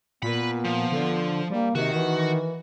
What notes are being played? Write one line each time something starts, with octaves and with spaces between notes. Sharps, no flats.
A#2 B3 B4 B5
F3
D3
G3 A#3
C3 D#3 F#4
E3